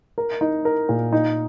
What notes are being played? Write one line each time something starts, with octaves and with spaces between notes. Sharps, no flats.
A#4
D#4
A#4
A#2
D#4